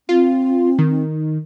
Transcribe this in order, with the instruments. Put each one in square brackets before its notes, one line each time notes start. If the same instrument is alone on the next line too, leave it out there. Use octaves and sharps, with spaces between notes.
[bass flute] C4 [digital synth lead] F4
[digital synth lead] D#3